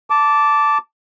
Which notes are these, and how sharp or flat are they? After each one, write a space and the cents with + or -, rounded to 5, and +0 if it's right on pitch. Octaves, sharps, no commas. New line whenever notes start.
A5 +0 D6 -10